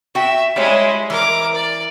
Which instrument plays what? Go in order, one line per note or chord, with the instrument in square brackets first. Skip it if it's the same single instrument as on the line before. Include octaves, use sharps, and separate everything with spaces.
[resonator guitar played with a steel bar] F#4 G5 [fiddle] E5
[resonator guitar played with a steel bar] G3 C#5 [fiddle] G#3 E4
[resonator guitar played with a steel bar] E3 [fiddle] A#4 D6
[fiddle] D5